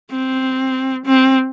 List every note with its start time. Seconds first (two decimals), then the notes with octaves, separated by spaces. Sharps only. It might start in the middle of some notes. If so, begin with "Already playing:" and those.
0.11 C4
1.05 C4